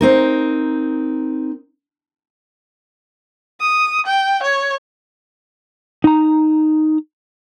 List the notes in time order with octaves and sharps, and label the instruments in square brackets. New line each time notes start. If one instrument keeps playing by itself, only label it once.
[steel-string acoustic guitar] C4 D#4 A#4
[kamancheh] D#6
G5
C#5
[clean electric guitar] D#4 A#5